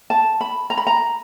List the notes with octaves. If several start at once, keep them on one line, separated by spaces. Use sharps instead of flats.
A5
B5
A#5
B5
A#5